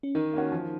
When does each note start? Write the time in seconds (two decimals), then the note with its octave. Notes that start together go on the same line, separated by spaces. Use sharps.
0.03 C#4
0.15 D#3 D#4
0.33 A#3 C#4 F#4
0.52 F3